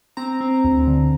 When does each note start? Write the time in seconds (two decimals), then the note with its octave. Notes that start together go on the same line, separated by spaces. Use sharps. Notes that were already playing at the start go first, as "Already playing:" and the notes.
0.17 C4 A#5
0.41 C4
0.64 D2
0.87 D3